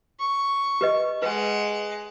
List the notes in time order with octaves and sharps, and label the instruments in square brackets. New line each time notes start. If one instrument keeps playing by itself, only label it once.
[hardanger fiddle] C#6
[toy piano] G4 B4 D#5
[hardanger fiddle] G#3 F#5 [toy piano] B4